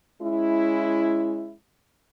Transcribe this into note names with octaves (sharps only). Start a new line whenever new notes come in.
G#3 C#4 E4